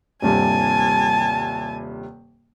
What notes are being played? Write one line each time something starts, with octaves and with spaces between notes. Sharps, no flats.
D#1 G2 C3 G#5 A5